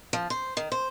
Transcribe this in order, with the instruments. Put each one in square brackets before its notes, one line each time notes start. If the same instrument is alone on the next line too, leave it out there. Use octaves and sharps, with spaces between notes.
[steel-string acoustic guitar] F3
C5
D#3
C5